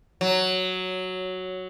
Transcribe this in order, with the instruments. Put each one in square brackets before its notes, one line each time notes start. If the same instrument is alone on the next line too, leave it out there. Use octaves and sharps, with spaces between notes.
[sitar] F#3